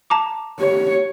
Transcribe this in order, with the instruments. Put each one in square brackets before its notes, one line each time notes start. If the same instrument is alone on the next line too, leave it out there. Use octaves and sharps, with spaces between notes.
[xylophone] A5 A#5 D6
[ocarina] G4 [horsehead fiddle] C#5